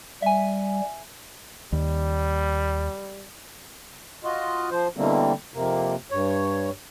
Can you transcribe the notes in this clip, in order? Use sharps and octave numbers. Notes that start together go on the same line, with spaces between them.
G3 E5 G#5
D#2 G3
F4 F#4 D#5
F3 C5
B2 D3 E3 G3 A#3 C4
F2 C3 A#3
G2 C#5